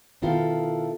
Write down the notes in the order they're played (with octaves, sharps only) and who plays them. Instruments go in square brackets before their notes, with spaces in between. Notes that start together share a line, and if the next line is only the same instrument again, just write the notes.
[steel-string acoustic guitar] B2 D#3 E4 F4 A4